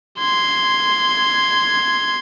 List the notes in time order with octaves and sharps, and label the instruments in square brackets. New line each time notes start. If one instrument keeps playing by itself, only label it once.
[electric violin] C6 G#6